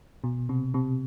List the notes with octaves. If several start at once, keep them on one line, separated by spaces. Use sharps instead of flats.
B2
C3
C3